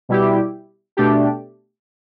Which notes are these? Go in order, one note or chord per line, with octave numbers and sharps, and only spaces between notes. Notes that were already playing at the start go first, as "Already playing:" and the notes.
B2 G3 E4 G4
B2 A3 D4 G4